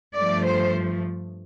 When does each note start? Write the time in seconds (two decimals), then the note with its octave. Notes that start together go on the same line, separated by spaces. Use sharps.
0.15 G2 F3 A3 D5
0.45 C5